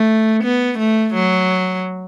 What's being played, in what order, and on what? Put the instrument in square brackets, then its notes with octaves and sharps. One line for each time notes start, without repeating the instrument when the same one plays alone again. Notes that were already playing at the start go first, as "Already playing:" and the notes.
Already playing: [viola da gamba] A3
B3
A3
F#3